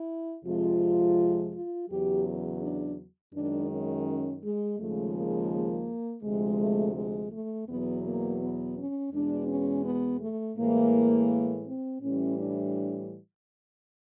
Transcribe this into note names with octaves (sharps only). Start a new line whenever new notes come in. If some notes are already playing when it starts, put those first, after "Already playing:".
Already playing: E4
F2 C3 F3 G#3 F4
F4
E2 C#3 F#3 G4
D4
F#2 D#3 G#3 D4
C#4
G#3
D#2 C#3 F3 G#3 A3
A#3
A#3
D2 C3 F3 G#3
A3
G#3
A3
E2 B2 F#3 B3
A#3
B3
C#4
E2 B2 G#3 D4
C#4
B3
A3
A2 E3 G#3 A#3
C4
A2 E3 G3 C#4
D4